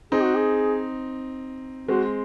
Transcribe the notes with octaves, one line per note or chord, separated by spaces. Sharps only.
C4 D#4 G#4
F#4
G#4
G#3 C4 F#4